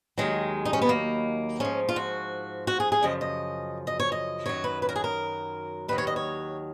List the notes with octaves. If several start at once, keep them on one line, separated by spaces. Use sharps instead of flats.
D#2 D#3 F#3 G#3
D#4
C#4
B3
A#3
G#2 F3 C#4
F4
F#4
F#4
G#4
G#4
F#2 C#3 F3 D#5
D#5
D#5
C#5
D#5
F#2 D#3 F#3 C#5
B4
B4
A#4
G#4
A#4
D#2 D#3 F#3 B4
C#5
D#5
C#5